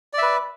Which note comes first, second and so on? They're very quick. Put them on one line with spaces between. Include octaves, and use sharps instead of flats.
D5 E5 B4